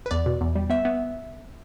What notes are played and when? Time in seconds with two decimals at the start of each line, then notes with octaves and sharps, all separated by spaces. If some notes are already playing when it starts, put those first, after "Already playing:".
0.06 B4
0.11 E2 D5
0.26 B2
0.41 E2
0.55 G3
0.70 B3 E5
0.85 B3